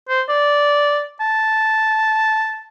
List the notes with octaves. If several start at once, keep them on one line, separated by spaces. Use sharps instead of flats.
C5
D5
A5